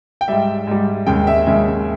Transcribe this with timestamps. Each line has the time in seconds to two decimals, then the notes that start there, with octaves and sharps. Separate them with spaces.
0.21 G5
0.28 G#2 G3 E5
0.67 G#2 G3
1.06 D#2 C#3 G#3 G5
1.27 E5
1.46 D#2 C#3 G#3 E5